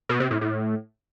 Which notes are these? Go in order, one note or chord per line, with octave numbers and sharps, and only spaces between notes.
B2
C3
A2
A2